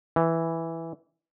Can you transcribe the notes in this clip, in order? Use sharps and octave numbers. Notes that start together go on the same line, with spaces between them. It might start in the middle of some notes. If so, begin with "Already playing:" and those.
E3